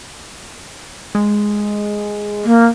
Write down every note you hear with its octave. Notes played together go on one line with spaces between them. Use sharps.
G#3
A#3